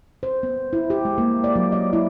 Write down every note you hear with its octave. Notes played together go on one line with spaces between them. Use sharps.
C5
B3
E4
G4
G#3
A#3
D5
F#3
D#5
E4